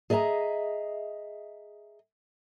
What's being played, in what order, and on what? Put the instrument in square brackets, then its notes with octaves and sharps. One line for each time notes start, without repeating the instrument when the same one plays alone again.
[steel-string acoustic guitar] G#4 D#5 E5 A5 A#5